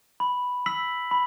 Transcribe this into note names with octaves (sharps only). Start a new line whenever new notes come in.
B5
E6 B6 F#7
B5